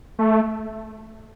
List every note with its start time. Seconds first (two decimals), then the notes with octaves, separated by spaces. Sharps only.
0.19 A3